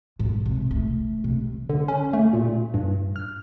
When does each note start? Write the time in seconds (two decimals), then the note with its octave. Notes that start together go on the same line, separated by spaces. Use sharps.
0.19 G#2
0.46 C3
0.71 A3
1.24 C3
1.69 D3
1.88 C#4
2.13 A3
2.33 A#2
2.74 G2
3.16 F6